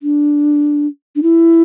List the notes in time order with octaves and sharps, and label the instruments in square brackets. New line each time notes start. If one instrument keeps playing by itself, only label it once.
[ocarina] D4
D4
E4